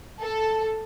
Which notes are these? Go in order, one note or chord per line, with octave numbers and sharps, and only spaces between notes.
A4